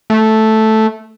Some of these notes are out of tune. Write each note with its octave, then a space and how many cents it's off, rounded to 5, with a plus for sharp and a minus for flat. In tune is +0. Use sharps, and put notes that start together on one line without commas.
A3 -5